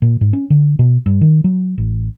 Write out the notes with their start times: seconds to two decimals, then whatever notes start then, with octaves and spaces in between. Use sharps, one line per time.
0.02 A#2
0.21 G#2
0.33 C#4
0.50 D3
0.79 B2
1.06 G2
1.21 D#3
1.44 F#3
1.78 A1